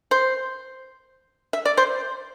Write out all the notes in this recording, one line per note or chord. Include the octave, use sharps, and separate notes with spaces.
C5
E5
D5
C5